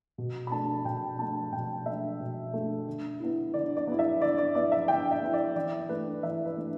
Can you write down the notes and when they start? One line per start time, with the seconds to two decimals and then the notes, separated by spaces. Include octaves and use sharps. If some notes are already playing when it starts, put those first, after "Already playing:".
0.18 B2
0.47 B5
0.52 A3 D4 A5
0.85 B2 G5
1.19 A3 D4 A5
1.52 B2 G5
1.86 A3 D4 E5
2.20 B2
2.53 A3 D4
2.87 D3
3.20 B3 E4
3.54 D3 D5
3.77 D5
3.87 B3 E4
3.99 E5
4.21 D3 D5
4.38 D5
4.55 B3 E4 D5
4.72 E5
4.88 D3 G5
5.11 E5
5.22 B3 E4
5.34 D5
5.56 E3 D5
5.89 A3 D4 B4
6.23 E3 E5
6.46 B4
6.56 A3 D4